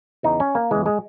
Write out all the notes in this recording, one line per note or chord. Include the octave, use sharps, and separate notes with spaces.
E2 C#3 E3 D#4
C#4
A#3
E2 C#3 E3 G#3
G#3